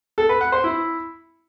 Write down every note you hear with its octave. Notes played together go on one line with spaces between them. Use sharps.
A4
B4
F#5
C5
E4